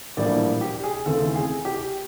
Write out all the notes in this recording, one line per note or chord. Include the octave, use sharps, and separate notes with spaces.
A#1 A2 E3 G3 A#3 D5
G4
G#4
D#2 C#3 E3 A3 C4 A4
G#4
G4